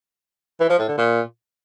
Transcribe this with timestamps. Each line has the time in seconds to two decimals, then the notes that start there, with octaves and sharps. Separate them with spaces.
0.60 E3
0.70 F3
0.79 A2
0.88 D3
0.98 A#2